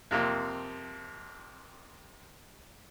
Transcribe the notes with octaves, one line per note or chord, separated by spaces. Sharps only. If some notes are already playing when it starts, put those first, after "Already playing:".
F2 C3 A#3